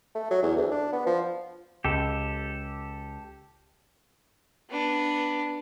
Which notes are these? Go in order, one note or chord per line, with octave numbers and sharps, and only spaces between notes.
A3
F#3
E2
D2
D4
B3
F3
C#2 G4 A4
B3 D4